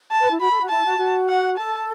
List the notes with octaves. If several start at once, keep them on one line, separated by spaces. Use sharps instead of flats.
A5
B4
E4
F#4 B5
A4
F#4
E4 A5
F#4
F#4
F#5
A4 A5